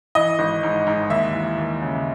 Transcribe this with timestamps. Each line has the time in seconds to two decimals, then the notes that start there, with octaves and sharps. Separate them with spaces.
0.15 E3 D#5
0.39 G#1
0.63 G#2
0.87 G#2
1.10 D#2 E5
1.34 E3
1.58 D#2
1.81 C#3